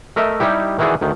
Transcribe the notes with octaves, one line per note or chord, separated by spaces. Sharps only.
A3 A#4 D#5 E5
G3 D#4 E4 G4
D#3 E3 E4 F#4 G#4 D5
D2 D#3